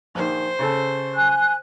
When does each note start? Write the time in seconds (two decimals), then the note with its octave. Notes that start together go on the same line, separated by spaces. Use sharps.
0.15 A#1 D#3 C5
0.59 C#3 C#4 A4
1.14 G#5 F#6